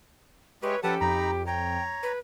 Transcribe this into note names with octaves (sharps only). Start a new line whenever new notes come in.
G#3 G4 B4 C#5 E5 C#6
F3 C#4 G4 A4 B4 F#5 A5
F2 D#4 A#5 B5
C#5 G5 A#5
B4